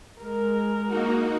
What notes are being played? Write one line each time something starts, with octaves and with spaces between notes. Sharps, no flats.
G#3 A#4
A#3 D#4 F#4